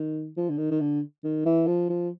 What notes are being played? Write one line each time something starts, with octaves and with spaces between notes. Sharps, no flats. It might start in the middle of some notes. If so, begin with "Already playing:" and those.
Already playing: D#3
F3
D3
D#3
D#3
D3
D#3
E3
F3
F3